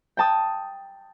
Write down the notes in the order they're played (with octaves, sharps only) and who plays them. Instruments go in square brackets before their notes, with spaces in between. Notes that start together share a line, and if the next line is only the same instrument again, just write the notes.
[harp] G5 A5 D#6